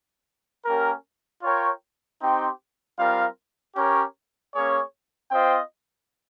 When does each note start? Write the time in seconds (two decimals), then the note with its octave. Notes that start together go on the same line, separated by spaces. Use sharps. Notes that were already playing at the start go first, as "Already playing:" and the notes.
0.65 A#3 C#4 G4 A#4
1.42 F4 A#4 C#5 G5
2.20 C4 D#4 G4 C5 G5
2.97 G3 C4 F4 A#4 F5
3.75 C#4 G4 A#4 C#5
4.53 A#3 C#4 G#4 C#5
5.30 C4 F4 C5 D#5 G5